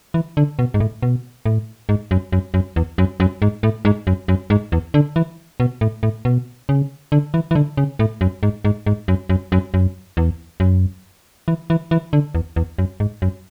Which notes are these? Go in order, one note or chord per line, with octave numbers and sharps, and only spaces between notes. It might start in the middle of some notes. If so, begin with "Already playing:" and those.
E3
D3
B2
G#2
A2
B2
A2
G#2
F#2
F#2
F#2
E2
F#2
F#2
G#2
A2
G#2
F#2
F#2
G#2
E2
D3
E3
B2
A2
A2
B2
C#3
D3
E3
E3
D3
C#3
A2
F#2
G#2
G#2
G#2
F#2
F#2
F#2
F#2
E2
F#2
E3
E3
E3
D3
E2
E2
F#2
G#2
F#2